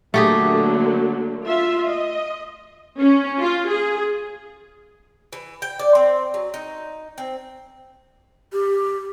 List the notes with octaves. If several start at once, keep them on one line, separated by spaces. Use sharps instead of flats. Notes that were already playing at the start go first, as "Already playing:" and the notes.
D3 F#3 A3 A#3 G4 G#4
F4 E5
D#5
C#4
F4
G#4
E3
G5
D5
C4
F#3
D#4
C4
G4